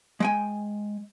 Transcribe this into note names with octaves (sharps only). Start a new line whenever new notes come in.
G#3 G5 G#5